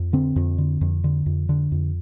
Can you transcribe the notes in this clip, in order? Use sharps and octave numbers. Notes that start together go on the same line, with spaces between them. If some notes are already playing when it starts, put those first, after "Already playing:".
Already playing: F2
D3 C4
F2
D3
F2
D3
F2
D3
F2